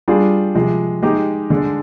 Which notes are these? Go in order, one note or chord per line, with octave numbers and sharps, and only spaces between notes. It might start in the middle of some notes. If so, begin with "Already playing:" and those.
G3 D4 F4 G#4
C3 F3 G#3
G#3 D#4 G4
D3 G#3 D4